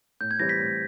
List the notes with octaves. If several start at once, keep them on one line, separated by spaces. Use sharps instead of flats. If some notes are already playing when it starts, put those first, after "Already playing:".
A2 G6
G#6
E3 G3 C4 A#6
B6
A2